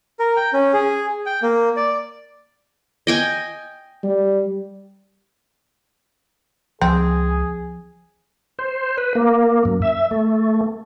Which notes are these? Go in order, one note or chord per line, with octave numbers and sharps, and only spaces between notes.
A#4
G5
C#4
G#4
G5
A#3
D5
D#5 G5 G#5
G3
C#2 F3 C4 G#4
C5
B4
A#3
F#2
E5
A3